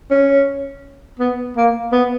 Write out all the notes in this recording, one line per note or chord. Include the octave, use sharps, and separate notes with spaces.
C#4
B3
A#3
B3